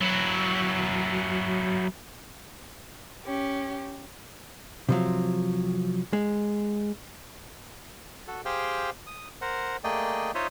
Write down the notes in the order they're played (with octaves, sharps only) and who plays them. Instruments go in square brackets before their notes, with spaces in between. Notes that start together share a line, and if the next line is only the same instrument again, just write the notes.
[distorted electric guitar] F#3 E4
[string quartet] C#4 G4
[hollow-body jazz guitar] C3 F3 F#3
G#3
[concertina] F#4 A4
G4 G#4 C5 F5 G5
D#6
A#4 C5 F#5
A3 A#3 G#4 D5 D#5 G5
D#4 F4 C5 C#5 D#5 E5